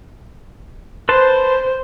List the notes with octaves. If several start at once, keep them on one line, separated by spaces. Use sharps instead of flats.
B4 C5 A5 C6